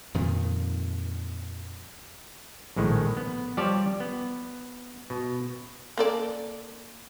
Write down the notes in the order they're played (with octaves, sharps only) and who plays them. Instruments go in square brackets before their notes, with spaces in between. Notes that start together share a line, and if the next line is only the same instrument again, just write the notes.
[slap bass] F2 A#2 D#3
[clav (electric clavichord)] A#1 A2 D#3 G#3
B3
F3 G3 G4 C#5 D5 A5
B3
B2
[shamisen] A#3 A4 D5